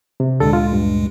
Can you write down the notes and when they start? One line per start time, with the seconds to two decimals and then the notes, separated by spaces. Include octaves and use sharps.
0.20 C3
0.40 D2 A#2 D3 G#3 A4
0.53 F4
0.73 G2